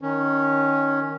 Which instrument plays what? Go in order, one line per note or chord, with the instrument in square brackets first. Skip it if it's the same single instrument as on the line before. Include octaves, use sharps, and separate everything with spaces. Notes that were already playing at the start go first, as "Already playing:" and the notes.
[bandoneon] D#3 C#4